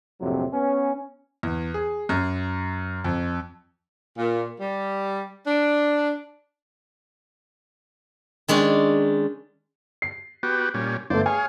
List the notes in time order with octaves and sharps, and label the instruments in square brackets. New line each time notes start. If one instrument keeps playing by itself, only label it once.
[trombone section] A#1 F2 A2 C3 F#3
B3 C#4
[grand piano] E2
G#4
F#2
F2
[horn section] A#2
G3
D4
[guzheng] D#3 G#3 C#4 D4
[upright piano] C7
[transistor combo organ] B3 F#4 G4
A#2 G3 C#4
[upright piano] G1 A3 [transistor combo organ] C5 D5
[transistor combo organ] G#4 C#5 F5 [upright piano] G#5